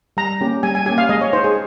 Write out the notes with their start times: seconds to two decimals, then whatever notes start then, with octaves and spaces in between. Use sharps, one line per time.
0.17 G3 A#5
0.41 A#3 C#4 G4
0.63 G3 G#5
0.75 G#5
0.86 A#3 C#4 G4 G#5
0.98 F5
1.09 G#3 D#5
1.21 C#5
1.33 D#4 G4 C5
1.44 G#4